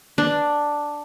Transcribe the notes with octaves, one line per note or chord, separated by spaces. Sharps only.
D4